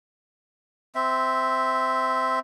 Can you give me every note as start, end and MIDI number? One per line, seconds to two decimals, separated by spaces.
0.95 2.39 60
0.95 2.39 76